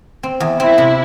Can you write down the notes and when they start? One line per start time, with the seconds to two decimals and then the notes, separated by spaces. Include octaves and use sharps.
0.23 C4
0.40 E2
0.59 C4 E4
0.78 C3